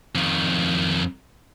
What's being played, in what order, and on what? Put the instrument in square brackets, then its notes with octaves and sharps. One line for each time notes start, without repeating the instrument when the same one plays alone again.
[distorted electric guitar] F2 D#3